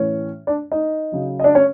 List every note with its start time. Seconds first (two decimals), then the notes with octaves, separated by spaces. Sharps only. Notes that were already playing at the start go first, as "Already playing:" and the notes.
Already playing: A2 E3 C#4 C#5
0.47 D4 D5
0.72 D#4 D#5
1.12 C#3 F#3
1.40 D#5
1.44 D4 D5
1.55 C#4 C#5